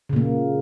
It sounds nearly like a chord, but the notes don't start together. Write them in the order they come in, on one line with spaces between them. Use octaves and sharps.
C#3 A#2 A#3